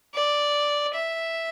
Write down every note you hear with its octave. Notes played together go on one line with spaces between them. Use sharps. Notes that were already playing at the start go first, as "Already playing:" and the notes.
D5
E5